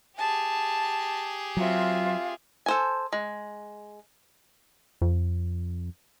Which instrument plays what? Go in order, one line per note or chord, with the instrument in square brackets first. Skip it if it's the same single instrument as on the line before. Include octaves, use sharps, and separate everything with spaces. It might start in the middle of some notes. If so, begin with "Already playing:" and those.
[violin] G4 G#4 [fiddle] A5
[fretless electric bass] F#3 [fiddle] C4 E5 [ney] F4
[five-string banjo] A4 C5 G#5
G#3
[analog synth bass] F2